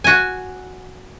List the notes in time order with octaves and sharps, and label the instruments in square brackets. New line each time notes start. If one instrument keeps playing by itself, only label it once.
[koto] F#4 G#5